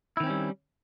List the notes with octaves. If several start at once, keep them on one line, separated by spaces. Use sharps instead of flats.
D#3 G3 C4 C#4 E4